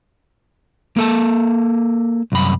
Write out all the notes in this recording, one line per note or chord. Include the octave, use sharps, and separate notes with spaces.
A#3 A4 A5
C2 F#2 B5